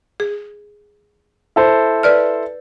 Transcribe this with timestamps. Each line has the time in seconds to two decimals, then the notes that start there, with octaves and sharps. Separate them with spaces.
0.20 G#4
1.56 E4 A4 C5
2.03 B4 D5 F6